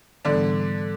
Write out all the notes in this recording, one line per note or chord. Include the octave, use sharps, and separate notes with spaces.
G#2 D3 E3 G3 B3 D4